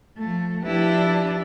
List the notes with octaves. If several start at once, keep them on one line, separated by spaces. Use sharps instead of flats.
F3 A3
F3 D4 E4 G4 B4